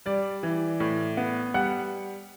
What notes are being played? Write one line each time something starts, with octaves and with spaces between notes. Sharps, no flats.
G3 D5
E3
A2
B3
G3 F#5